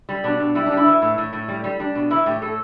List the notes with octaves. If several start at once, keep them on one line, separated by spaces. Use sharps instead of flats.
G3
B2 D4
B2
G3 E4
D4
G3
E4
E3
A2
A2
A2
G3
G3
G3 D4
B2
E3 E4
A2 G4
A2 A4